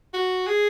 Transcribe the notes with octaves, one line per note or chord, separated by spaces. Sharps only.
F#4
G#4